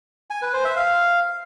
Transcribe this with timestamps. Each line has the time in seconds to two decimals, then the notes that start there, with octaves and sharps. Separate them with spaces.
0.30 G#5
0.42 B4
0.53 C5
0.65 E5
0.76 F5